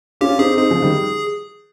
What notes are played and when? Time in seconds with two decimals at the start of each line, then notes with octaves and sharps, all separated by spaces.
0.21 C#4 F4 G4
0.39 C4 D#4 G#4
0.57 C4 D#4 G#4
0.70 C#3 F3
0.82 D#3 G3